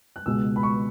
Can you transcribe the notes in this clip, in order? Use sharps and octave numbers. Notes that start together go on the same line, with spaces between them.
F#6
C#2 B2 G#3 E6
B5
C#6